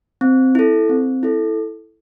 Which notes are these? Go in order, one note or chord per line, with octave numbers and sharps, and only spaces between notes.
C4
E4 A4
C4
E4 A4